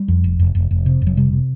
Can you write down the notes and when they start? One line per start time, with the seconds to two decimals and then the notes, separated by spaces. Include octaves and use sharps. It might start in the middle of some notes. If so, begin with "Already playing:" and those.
Already playing: G3
0.08 F2
0.24 F1
0.39 F1
0.55 F1
0.71 F1
0.86 C3
1.02 F1
1.07 F#3
1.17 C3 G3
1.33 C3